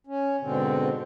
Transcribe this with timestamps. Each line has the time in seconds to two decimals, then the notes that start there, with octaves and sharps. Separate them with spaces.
0.07 C#4
0.41 G#2 B2 D3 C4